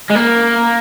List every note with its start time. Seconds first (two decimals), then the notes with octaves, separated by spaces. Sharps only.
0.10 G#3
0.16 A#3